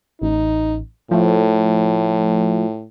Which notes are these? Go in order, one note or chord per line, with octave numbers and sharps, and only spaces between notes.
A1 D#4
A2 F3 A3